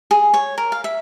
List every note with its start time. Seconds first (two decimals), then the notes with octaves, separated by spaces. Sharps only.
0.11 G#4
0.34 C#5
0.58 A#4
0.72 F5
0.84 E5